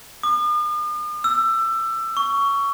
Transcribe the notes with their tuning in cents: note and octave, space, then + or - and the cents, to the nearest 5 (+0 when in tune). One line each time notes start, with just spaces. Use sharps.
D#6 -45
E6 +20
C#6 +15